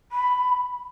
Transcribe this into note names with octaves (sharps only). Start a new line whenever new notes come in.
B5